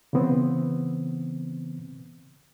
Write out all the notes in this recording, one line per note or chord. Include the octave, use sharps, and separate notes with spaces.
C#3 E3 B3 C4